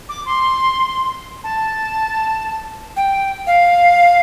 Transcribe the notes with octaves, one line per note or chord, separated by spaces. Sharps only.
D6
C6
A5
G5
F5